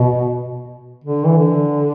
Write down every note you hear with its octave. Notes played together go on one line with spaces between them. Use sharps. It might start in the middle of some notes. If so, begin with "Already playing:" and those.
Already playing: B2
D3
E3
D3